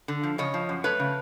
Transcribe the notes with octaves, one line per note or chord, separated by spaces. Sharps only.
D3
F3
C#3 C#5 D#5
F3
F#2
A3 B4 C#5
C#3